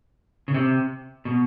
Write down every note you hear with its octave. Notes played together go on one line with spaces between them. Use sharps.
C#3
C3
B2